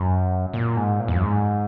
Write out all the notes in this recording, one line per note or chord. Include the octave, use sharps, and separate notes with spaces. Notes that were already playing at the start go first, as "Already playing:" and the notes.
Already playing: F#2
A#2
G#2
A#2
E2
F#2
G#2